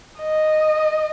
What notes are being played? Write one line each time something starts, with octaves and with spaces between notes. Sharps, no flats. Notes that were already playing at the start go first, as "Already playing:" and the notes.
D#5